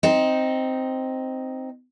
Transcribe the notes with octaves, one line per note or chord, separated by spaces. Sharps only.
C4 D#4